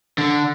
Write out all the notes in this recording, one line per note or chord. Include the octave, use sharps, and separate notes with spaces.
D3